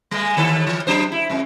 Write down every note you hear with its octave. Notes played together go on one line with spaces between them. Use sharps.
G3 G#3
D#2 D#3 A4
E3
F#3 D4 C5
E4
F2 G#3